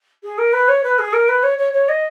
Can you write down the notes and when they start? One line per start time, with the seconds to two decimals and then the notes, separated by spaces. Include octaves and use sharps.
0.24 G#4
0.38 A#4
0.53 B4
0.68 C#5
0.83 B4
0.99 G#4
1.13 A#4
1.28 B4
1.43 C#5
1.58 C#5
1.73 C#5
1.89 D#5